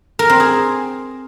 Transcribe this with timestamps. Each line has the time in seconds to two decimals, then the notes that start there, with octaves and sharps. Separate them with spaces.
0.19 A#4
0.30 C4
0.40 G#4